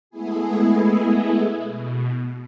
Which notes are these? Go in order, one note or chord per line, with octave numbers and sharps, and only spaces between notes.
G#3 A3 B3 E4 G#4
B2